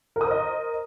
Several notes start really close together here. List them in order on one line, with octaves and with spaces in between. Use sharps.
A#4 D#6 C5 D#5